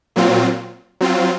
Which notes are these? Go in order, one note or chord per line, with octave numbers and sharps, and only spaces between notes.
A#2 F#3 C4 F4
F#3 C4 F4